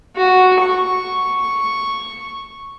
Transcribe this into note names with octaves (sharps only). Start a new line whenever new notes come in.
F#4
C#6